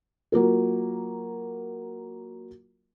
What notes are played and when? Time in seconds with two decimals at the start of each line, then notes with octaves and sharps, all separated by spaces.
0.32 F#3 A#3 F4 A#4